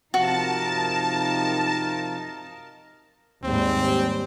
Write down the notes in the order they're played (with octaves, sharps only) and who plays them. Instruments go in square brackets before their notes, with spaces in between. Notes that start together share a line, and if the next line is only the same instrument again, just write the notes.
[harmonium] C3 F3 [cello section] D#4 A#4 [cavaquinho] F#4 [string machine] A5
[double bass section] D#2 G#2 G3 [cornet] C4